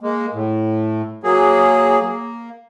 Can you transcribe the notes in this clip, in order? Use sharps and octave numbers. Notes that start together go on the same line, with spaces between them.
G#3 A#3
A2
F#3 A#3 G#4
A#3